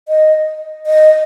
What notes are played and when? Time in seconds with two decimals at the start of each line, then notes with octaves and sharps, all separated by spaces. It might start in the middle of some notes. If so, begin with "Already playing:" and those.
0.08 D#5
0.87 D#5